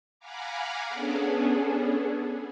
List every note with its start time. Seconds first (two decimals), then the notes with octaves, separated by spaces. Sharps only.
0.20 F5 F#5 G#5 A#5 B5 D6
0.88 B3 C#4 D4 G#4 A4